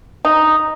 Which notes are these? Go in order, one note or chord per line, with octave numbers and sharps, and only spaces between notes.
D#4